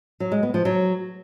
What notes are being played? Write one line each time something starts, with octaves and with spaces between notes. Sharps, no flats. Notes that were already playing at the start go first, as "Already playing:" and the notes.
F#3
G#3
B3
F3
F#3